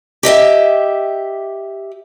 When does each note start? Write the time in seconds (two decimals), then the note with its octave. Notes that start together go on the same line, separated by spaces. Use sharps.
0.23 G4 D#5 E5 G5